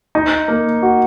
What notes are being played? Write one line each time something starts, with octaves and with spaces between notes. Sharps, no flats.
D#4
A#3
F#4